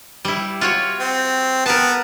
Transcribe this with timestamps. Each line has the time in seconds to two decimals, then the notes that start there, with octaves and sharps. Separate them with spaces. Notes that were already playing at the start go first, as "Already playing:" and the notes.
0.25 G3 E4
0.61 F4 F#4 C#5
0.98 C4
1.66 B3 A#4 A5